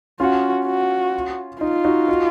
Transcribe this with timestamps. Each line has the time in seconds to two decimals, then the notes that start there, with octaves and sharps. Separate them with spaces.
0.20 C#4 F4 F#4
0.66 F#4
1.61 D#4 F4
1.85 D#4 F#4
2.08 D#4 F#4